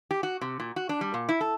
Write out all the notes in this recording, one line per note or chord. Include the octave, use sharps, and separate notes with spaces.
G4
F#4
C3
A#2
F#4
D4
G3
A#2
E4
A4